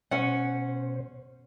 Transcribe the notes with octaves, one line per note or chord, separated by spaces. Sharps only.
B2 C#4 C5 F#5